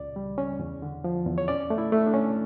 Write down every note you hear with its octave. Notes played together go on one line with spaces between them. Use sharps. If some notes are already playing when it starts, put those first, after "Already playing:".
Already playing: C#2 C#3 D5
G3
C#4
E2
D3
F3
E2
C#5
C#4 D5
A3
E4
A3
D4
C#4